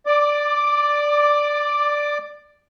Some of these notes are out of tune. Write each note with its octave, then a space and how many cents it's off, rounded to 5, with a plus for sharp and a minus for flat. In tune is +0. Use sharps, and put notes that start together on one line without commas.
D5 +0 D6 +25